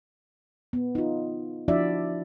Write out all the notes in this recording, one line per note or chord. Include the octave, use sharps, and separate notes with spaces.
B3
D#4 F4
F3 D4 E4 F#4 D5 E5